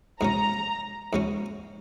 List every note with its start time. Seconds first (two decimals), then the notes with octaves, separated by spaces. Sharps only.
0.21 G#2 F#3 C#4 A#5
1.13 G#2 F#3 C#4